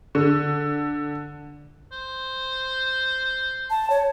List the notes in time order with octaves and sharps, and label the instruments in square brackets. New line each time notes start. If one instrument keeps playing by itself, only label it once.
[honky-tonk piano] D3
[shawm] C5
[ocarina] A5
C#5